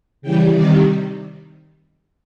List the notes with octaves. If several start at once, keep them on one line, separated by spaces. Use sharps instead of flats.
C#3 E3 G3 G5
C3 D#3 G3 D5